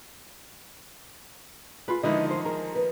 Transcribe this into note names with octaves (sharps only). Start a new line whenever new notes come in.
F4 G#4 B4
D3 D#3 F3 G#3 D#4 E4 B4 D#5
C5
G#4 A#4
B4